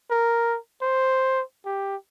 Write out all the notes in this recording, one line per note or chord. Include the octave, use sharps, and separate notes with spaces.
A#4
C5
G4